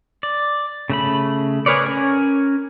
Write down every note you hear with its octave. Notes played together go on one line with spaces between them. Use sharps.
D5
C#3 A3 B5
G#4 A#4 B4 C#5 D5
C#4 A#4 G#5